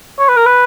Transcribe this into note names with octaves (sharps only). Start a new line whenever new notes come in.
C#5
B4
A#4
B4